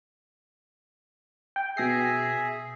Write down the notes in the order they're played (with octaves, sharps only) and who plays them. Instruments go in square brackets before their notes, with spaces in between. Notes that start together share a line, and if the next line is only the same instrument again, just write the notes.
[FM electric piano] G5
[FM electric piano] B2 A#6 C7 [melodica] G#4 E5